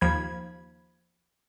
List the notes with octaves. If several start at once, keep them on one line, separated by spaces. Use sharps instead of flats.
D#2 F3 B5 G#6